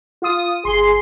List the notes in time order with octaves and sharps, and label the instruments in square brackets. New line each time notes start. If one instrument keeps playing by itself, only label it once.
[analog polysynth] F4 D#6
[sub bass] G1 [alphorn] G#4 [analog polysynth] C6